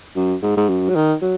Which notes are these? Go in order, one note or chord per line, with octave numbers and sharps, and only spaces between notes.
F#2
G#2
G#2
F#2
F#3
D#3
F#3